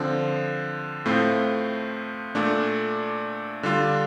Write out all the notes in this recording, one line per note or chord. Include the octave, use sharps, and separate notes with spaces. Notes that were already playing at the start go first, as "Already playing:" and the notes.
Already playing: D3 F3 C4
A2 A3 C4 F4
A#2 A3 D4
D3 G3 D4 F4